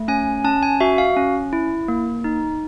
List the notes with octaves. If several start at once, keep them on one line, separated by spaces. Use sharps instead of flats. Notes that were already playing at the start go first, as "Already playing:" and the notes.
Already playing: A3
C#4 G#5
C#4 A5
G#5
F#4 E5
F5
C#4
E4
A#3
D#4